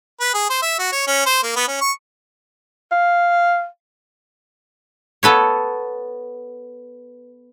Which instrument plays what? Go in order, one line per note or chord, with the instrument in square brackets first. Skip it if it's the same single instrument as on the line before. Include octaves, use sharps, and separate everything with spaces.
[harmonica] B4
G#4
C5
E5
F#4
C#5
C#4
C5
A#3
B3
C#4
C#6
[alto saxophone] F5
[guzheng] B3 A4 B4 C#5